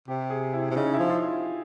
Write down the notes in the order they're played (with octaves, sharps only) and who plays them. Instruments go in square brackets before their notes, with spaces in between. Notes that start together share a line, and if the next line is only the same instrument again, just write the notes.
[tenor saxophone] C3 [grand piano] G4
[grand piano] G#4
E4
[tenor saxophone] C3
[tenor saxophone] C#3 [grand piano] D#4
[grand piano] E4
[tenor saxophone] F3
[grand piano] F4